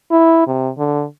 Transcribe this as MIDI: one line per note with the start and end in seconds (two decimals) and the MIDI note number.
0.11 0.43 64
0.47 0.69 48
0.78 1.04 50